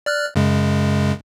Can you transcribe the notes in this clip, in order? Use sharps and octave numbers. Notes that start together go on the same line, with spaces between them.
D5 F6 F#6
F#2 C#3 G#3